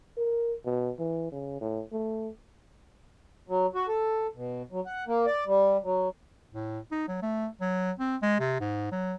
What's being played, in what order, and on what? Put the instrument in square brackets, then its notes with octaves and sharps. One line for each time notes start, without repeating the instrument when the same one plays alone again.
[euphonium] A#4
B2
E3
C#3
A2
A3
[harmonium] F#3
F#4
A4
B2
F#3
F#5
A#3
D5
G3
F#3
[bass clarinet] A2
D#4
F#3
A3
F#3
C4
G#3
C3
G#2
F#3